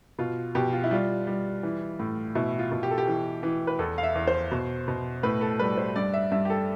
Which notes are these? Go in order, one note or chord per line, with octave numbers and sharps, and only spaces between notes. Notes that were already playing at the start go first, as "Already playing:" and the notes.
B2 F4
B2 G4
F4
E4
G3 F4
G3
E3
A2
B2 E4
F4
B2
G4
A4
G4
E3
E3
B4
E2 A4
F5
E5
E2
C5
B2
B2
A2 B4
A4
G3 B4
C5
G2 D5
E5
G2 E5
G4
A4